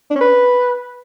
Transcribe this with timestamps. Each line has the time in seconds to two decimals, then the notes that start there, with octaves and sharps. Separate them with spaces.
0.11 D4
0.16 C#4
0.21 B4